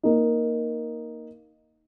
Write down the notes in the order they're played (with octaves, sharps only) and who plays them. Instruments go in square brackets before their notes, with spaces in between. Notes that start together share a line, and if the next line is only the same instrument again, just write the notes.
[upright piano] A#3 D#4